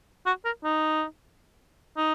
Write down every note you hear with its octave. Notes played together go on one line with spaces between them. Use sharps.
F#4
A#4
D#4
D#4